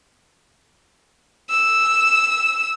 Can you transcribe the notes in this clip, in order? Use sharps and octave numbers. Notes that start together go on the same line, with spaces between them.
E6